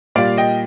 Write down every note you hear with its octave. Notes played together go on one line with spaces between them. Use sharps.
A#2 G3 D5 F5
D#5 G5